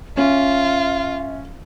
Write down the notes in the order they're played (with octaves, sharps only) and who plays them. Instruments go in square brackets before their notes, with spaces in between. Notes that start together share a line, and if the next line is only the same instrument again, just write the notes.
[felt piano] C#4 [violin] F4 [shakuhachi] E5